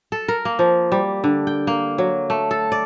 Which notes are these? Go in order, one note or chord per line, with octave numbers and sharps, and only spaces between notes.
A4
A#4
A#3
F3
G3
D3
G5
A#3
F#3
A3
A4
D5